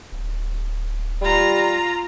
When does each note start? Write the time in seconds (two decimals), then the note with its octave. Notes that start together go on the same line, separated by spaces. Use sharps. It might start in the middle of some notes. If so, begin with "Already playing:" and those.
0.12 D1
1.22 G3 F4 A#5